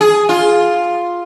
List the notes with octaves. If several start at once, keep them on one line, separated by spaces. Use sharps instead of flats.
G#4
F4